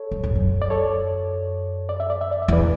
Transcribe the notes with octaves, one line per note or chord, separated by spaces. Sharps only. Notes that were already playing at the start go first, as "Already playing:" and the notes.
Already playing: A4 C#5
F#2
E2
F#2
D5
A4 C#5
D5
E5
D5
E5
D5
E5
E2 B4 D5